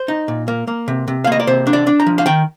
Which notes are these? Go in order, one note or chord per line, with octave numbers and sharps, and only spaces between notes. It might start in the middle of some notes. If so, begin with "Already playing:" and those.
Already playing: C5
D#4
A#2
A#3
A#3
C3
C3
F5
A#3 D#5
D5
C3 C5
D4
D5
D4
A#5
F3
F5
D#3 G5